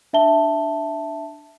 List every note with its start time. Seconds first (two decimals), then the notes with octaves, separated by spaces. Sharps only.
0.13 D4 E5 A5 G7